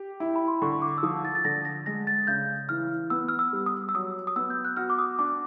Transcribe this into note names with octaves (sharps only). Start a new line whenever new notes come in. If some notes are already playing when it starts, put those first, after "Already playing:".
Already playing: G4
E4
B5
C6
D3 C#6
D6
E6
F3 D#6
A6
A6
D3 A#6
A#6
G#3 A#6
A6
C#3 G6
E3 F6
B3 E6
F6
E6
G3
D#6
E6
F#3 D#6
D#6
B3 E6
G6
F#6
F#4 F6
D6
D#6
D4 D6